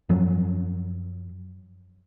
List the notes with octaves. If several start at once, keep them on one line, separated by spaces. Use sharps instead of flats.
F#2 F3 F#3